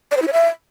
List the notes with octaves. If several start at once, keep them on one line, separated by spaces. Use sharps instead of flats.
D5
C5
E4
C#5
E5